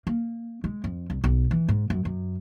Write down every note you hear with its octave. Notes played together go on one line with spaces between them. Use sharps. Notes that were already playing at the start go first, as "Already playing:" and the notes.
A#3
G#3
F2
C2
B1
E3
G#2
F#2
F#2